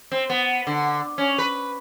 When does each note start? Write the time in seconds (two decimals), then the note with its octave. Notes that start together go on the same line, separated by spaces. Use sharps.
0.12 C4
0.30 B3
0.67 D3
1.18 C#4
1.38 B4